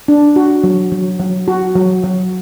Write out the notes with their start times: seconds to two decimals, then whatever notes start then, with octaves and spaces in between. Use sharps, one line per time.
0.08 D4
0.36 F#4
0.64 F#3
0.92 F#3
1.20 F#3
1.48 F#4
1.76 F#3
2.04 F#3